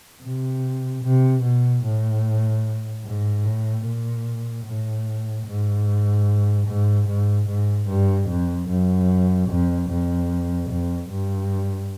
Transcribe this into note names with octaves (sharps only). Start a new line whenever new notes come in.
C3
C3
B2
A2
G#2
A2
A#2
A2
G#2
G#2
G#2
G#2
G2
F2
F#2
F2
F2
F2
G2